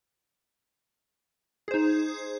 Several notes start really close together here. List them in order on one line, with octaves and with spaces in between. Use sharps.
G#4 C5 D#4